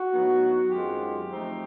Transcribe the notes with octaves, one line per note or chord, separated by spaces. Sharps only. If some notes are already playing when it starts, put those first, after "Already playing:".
Already playing: F#4
A2 F#3 B3 D#4
F#2 D#3 G#3 C4 F4 G4
F3 A3 C4 D#4